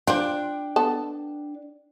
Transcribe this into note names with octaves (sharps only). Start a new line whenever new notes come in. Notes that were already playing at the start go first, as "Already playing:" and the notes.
D4 F4 C5 G5
B3 A4 A5